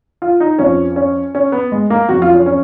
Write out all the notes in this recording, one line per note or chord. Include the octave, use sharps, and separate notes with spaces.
F4
D#4
F2 F3 C#4
C#4
C#4
B3
G#3
A#3
F2 C#3 F#3 F#4
F4
C#4
C#4